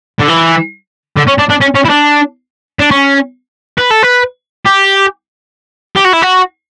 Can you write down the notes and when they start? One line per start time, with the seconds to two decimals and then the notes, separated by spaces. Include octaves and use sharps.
0.20 D3
0.29 E3
1.17 D3
1.27 C#4
1.38 D4
1.49 D4
1.61 C#4
1.75 C#4
1.85 E4
1.89 D4
2.80 D4
2.91 C#4
3.78 B4
3.91 A4
4.03 B4
4.65 G4
5.96 G4
6.05 F#4
6.13 E4
6.23 F#4